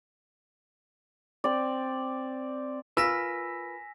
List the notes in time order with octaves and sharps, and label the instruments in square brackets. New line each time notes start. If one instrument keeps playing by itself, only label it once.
[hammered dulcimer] C4 D5
[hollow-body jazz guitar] F4 A#4 B4 [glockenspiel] G#5 A#6 B6 [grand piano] E6